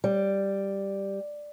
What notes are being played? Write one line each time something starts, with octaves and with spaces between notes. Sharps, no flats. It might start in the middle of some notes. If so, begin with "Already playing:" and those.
G3